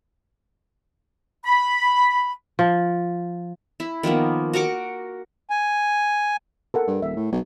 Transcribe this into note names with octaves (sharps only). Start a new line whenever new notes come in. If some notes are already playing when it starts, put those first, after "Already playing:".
B5
F3
E4
D#3 F3 A#3 B3
F#4 A#4 C#6 D6
G#5
A4 A#4 F#5
G2
D#1 E5
A2
B1